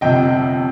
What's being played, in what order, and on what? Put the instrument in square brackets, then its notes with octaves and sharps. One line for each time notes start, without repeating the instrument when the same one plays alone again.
[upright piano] G1 F2 C3 D#5 G5